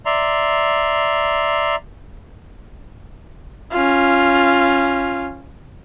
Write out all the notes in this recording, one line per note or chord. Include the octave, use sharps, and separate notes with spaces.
D5 E5 A#5 C6
C#4 F4